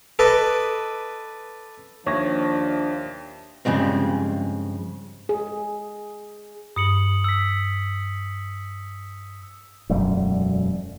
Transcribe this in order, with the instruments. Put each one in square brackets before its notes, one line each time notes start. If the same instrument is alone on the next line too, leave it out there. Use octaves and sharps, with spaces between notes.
[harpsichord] A4 B4 D5 D#5
[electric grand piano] D#2 E5 A#6 [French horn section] F3 D4 [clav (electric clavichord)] C#5
[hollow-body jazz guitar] G2 C#3 F3 G#3 C4
[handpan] G#4
[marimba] G2 [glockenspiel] D#6 C#7 F#7
[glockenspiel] E6 B6
[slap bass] E1 F#2 G3 A3